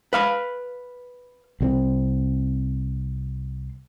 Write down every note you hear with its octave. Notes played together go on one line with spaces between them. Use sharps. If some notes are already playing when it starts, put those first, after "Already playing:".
B4 F5 B5
C2 F3 C4